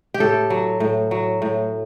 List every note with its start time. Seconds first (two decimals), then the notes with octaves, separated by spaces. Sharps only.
0.14 G4
0.20 A2 A4
0.50 F#3
0.80 A2
1.11 F#3
1.42 A2